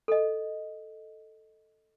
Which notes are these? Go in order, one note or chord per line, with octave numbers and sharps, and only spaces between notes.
A4 D#5